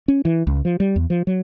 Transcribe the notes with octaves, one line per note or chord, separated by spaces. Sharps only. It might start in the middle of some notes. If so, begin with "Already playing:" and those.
C#4
E3
C#2
F3
G3
E2
F3
F#3